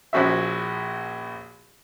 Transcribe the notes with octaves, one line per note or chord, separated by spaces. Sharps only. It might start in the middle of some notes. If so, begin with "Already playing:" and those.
A#1 F3 C#4 F#4 C5 E5